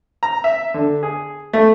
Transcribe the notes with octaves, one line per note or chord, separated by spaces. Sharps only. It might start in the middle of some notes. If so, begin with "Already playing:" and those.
A#5
E5
D3
G#4
A3